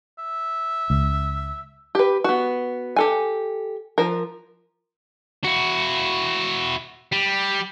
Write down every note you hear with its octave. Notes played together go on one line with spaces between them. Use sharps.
E5
C#2
G4 B4
B3 F#4
G4 A4 G#5
F3 A#4
E4 F#4
G3